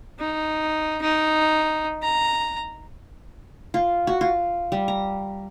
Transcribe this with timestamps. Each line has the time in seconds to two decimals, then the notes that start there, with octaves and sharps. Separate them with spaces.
0.19 D#4
1.01 D#4
2.02 A#5
3.74 F4
4.07 F#4
4.21 F4
4.72 G3
4.88 A#5